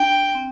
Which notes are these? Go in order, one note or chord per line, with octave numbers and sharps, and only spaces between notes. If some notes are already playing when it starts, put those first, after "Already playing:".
Already playing: D4 G5
C4